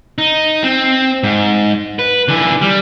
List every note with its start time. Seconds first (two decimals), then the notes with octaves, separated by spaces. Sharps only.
0.18 D#4
0.64 C4
1.23 G#2
1.99 B4
2.28 D3 E3
2.61 G3